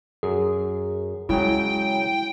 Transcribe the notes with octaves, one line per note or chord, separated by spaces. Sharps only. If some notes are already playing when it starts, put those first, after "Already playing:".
F#2 G#4
C#3 F#3 G#3 E4 G5